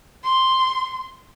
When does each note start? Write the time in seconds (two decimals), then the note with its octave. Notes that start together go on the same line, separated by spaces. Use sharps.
0.24 C6